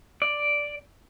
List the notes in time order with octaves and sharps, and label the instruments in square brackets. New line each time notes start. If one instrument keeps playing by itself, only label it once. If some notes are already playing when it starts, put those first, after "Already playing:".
[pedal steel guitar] D5